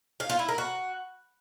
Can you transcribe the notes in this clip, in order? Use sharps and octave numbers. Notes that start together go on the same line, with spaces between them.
F5
F4
E4
A#4
F#4